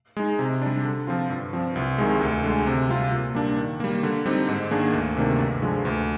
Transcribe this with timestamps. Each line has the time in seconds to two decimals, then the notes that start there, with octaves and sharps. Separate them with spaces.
0.17 G#3 D#4
0.39 C3
0.62 G3 D4
0.85 D3
1.07 F3 C4 F4
1.30 G2
1.53 F3 C4
1.76 C2
1.98 C3 D#3 G#3
2.21 D2
2.44 D3 G#3
2.66 C3
2.89 G3 C4 F4
3.12 A#2
3.35 G3 A#3 D4
3.57 D#3
3.80 G3 A#3
4.03 D3
4.26 G3 C4 D#4
4.49 G#2
4.71 D#3 A#3 D4 G#4
4.93 D2
5.17 C3 D#3 A#3 D4
5.39 G2
5.62 D3 F3 G#3
5.85 D2